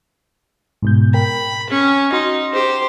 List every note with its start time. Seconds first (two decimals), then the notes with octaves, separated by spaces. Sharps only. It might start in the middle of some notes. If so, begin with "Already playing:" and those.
0.82 G#2 B2 G6
1.14 A#4 G5 B5
1.70 C#4
2.12 D#4 F#4 C6
2.54 G4 C5